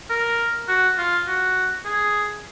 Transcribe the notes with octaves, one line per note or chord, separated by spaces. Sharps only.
A#4
F#4
F4
F#4
G#4